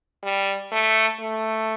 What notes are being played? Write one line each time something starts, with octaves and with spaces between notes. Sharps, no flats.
G3
A3
A3